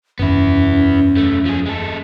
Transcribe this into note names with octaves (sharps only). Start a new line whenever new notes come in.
F#1 E2 B3 C#4 E4
F#2 A3
F3 G#4
G#3 A4